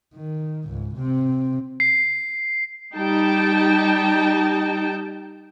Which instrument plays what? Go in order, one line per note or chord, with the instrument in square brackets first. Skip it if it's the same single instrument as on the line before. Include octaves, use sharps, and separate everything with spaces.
[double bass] D#3
C#2 G#2
C3 C4
[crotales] C7
[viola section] G3 D#4 G5 A5